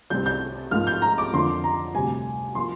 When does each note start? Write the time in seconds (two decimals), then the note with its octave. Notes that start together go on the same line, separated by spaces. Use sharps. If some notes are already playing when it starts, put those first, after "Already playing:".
0.10 C2 C3 G3 C4 G6
0.26 G6
0.71 G#2 F3 A#3 F6
0.87 G6
1.02 A#5
1.18 D6
1.33 F2 D3 F3 A#3 C6
1.64 A#5
1.95 D2 C3 G3 G#5
2.55 F3 A#3 C6